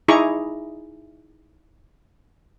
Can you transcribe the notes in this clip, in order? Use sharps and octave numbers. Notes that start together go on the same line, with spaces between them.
D#4 E4 G#4 A#5 C#6 D6